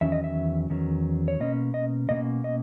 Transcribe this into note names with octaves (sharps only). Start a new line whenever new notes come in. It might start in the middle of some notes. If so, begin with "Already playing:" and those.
E2 D#3 F#3 C#4 E5
D#5
E5
E2 D#3 F#3 C#4
C#5
B2 A#3 C#4 D#5
D#5
B2 A#3 C#4 D#5
D#5